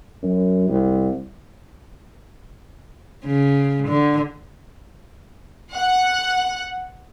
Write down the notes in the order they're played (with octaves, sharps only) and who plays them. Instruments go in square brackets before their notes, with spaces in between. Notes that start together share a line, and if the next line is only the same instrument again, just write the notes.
[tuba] F#2
C2
[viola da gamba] C#3
D3
[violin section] F#5